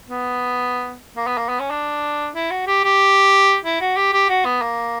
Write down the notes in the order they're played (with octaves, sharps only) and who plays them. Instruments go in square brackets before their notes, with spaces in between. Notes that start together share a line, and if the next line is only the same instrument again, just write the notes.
[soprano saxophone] B3
A#3
B3
A#3
B3
C#4
D4
E4
F#4
G4
G4
E4
F#4
G4
G4
F#4
B3
A#3